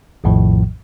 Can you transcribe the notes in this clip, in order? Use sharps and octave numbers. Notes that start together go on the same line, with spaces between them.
A#1 F2 A2 D#3 F3